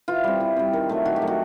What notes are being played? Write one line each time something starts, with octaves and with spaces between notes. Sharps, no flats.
E3 F4
G3 C4
E3
G3 C4
D#3
F#3 A3
D#3 F#4
G4
F#3 A3
F#4